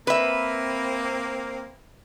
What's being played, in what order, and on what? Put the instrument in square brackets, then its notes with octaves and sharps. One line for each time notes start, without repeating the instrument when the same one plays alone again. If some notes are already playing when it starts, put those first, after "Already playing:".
[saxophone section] A#3 C4 [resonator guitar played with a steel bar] B4 E5